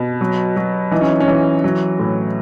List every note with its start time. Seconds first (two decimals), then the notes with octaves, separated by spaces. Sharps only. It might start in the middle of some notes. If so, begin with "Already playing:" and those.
Already playing: B2
0.21 F#3
0.56 F#3
0.91 E3 D#4
1.01 C#4
1.20 C#4
1.28 E3
1.64 F#3
1.99 A2